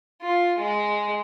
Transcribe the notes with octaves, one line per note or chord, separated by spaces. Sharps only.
F4
G#3